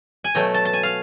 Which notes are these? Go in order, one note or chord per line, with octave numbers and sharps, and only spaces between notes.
G#5
B2 F#3 A3 G5
A5
A5
G#5
F5